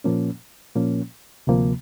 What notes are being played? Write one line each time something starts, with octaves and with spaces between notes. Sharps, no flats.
A#2 F3 A#3 C#4
A#2 F3 A#3 C#4
D2 C3 F3 A#3